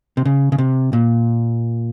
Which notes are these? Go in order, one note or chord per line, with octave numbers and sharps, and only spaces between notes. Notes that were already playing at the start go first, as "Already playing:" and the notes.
C3
C#3
C#3
C3
A#2